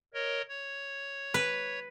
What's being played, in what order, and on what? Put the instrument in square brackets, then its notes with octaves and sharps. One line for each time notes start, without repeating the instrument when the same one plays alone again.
[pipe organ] A#4 C#5 D#5
C#5
[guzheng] B4